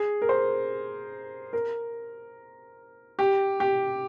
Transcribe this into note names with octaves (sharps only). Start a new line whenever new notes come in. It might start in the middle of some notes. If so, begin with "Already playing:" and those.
Already playing: G#4
A#4
C5
A#4
G4
G4